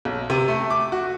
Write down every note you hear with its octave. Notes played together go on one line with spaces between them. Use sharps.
B1
C3
A3
D6
F#4